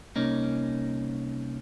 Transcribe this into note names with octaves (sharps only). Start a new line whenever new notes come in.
C2 A#3 C#4 D#4